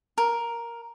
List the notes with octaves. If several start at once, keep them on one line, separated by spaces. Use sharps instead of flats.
A#4